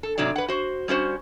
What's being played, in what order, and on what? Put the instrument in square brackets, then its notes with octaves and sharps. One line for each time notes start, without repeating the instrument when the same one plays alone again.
[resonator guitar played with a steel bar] A4
G#2 C3 F#3 D4 D5
B4 F#5
F#4 C5
G3 C#4 F#4 C5